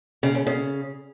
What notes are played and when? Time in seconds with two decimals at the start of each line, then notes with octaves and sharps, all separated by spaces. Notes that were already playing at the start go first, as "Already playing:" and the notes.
0.23 C#3
0.35 C#4
0.47 C#3